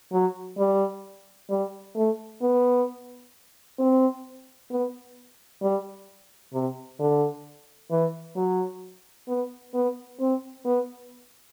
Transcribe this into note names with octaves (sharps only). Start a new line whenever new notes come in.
F#3
G3
G3
A3
B3
C4
B3
G3
C3
D3
E3
F#3
B3
B3
C4
B3